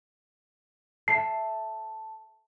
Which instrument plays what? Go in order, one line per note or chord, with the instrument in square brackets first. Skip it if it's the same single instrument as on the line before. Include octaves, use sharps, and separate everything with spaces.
[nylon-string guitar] A4 E5 [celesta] A5 [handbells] C7